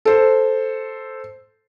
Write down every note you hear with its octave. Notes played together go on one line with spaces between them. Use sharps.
A4 C5